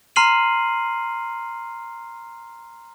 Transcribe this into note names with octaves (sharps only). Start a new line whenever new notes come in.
A#5 C6 F6 C7 D#7 F#7